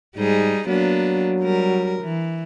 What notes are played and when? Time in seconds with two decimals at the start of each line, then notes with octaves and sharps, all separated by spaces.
0.17 G#2 G3 D#4 G#4
0.68 F#3 A#3 B3 D4
1.41 G3 A#4
2.03 E3